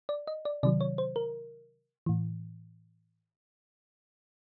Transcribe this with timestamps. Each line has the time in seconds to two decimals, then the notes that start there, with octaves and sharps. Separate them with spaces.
0.09 D5
0.27 D#5
0.45 D5
0.63 C3 D#3 F#3 D5
0.81 C#5
0.98 C5
1.16 A#4
2.06 A2 E3